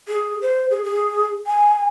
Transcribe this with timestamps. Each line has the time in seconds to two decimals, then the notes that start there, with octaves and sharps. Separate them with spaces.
0.08 G#4
0.42 C5
0.70 G#4
0.83 G#4
1.47 G#5